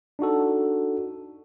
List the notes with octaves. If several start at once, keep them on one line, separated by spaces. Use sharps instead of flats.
D4 D#4 F#4 A4